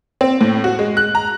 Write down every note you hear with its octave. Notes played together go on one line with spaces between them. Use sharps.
C4
A2
F#4
G#3
F#6
A#5